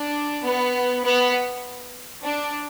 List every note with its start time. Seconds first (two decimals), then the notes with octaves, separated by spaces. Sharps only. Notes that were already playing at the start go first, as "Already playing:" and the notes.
Already playing: D4
0.43 B3
1.04 B3
2.25 D4